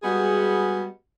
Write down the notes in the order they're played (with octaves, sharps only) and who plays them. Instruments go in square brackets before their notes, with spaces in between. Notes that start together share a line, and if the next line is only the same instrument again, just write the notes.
[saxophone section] G3 G#3 B3 F#4 G#4